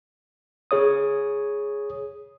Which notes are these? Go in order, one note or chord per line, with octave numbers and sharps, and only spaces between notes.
G#4 C#5 D#6